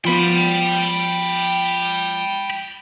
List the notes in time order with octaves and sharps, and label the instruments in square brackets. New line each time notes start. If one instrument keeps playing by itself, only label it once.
[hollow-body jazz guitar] F3 B3 [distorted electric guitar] G5 B5